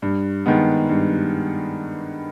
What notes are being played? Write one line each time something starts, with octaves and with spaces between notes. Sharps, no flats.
G2
D#3 G#3 B3
G2